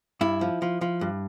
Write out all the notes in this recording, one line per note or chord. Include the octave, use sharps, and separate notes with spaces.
G2 E4
F3
F3
F3
G2